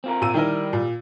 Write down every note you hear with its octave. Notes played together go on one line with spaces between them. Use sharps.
C4 F4 A#4
A#2 E6 D#7
D#3 G3 E4 A#4
A#2